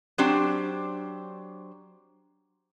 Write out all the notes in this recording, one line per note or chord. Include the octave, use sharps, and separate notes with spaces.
F#3 C4 D4 G4 C5